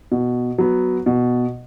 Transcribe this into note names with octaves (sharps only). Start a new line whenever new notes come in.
B2
F#3 B3
B2